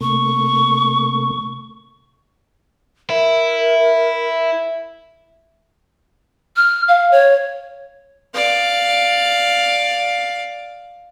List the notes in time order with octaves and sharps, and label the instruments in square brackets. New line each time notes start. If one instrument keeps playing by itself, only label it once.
[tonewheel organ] C3 A3 A#3 [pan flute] C#6
[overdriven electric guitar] E4 [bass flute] A#4 [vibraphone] E5
[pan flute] F6
F5
C#5
[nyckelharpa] D5 F5